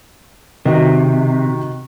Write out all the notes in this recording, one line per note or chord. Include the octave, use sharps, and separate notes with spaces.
C3 D#3 F#4